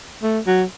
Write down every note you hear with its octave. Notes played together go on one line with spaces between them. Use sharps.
A3
F#3